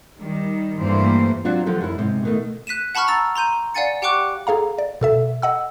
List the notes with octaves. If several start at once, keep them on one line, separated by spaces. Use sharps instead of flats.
D#3 G3
G2 E3 G3 A3 A#3 C5
F#3 C4 D4 F4
D3 F3 F#3 G4 A4
F#2 E4
G#2 C3
B2 D#3 A3
F#6 B6 D#7 E7
F#5 A5 B5 C#6 F6
A#5 E6 A6
A#5 C6 G6 D#7
D5 F5 F#5 G#5 A6 C#7
G4 F#5 G5 C#6 D6 F#6
G#4 A4 F5 A#5
D5
B2 A4 E5
D#5 F#5 E6